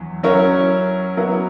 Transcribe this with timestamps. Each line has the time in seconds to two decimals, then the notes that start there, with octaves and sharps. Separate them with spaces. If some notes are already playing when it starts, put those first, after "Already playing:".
Already playing: E2 F#3
0.23 F#3 C#4 E4 A#4
1.17 F#3 B3 E4 A#4